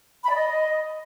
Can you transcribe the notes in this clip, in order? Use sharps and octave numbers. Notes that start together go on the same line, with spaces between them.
B5
D5
D#5